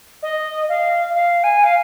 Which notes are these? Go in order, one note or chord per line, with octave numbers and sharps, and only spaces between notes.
D#5
F5
F5
G#5
F5